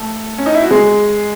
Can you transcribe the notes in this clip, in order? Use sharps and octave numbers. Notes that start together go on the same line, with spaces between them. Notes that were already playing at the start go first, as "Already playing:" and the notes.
Already playing: A3 A4
C#4
D#4
E4
F#4
G#3 G#4